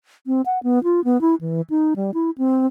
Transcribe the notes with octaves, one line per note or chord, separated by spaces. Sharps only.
C4
F#5
B3
F4
B3
E4
E3
D#4
G3
E4
C4